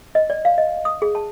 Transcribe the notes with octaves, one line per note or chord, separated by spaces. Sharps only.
D#5
D5
F5
D#5
D#6
G#4
A5